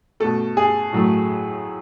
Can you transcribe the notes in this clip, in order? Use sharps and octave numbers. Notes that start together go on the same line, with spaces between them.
B2 A3 A4
G#4
A2 F#3 A3